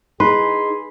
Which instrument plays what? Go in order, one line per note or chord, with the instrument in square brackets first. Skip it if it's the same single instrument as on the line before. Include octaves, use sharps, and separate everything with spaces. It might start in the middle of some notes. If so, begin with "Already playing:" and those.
[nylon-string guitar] D#4 [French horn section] G#4 [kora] B4 [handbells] C6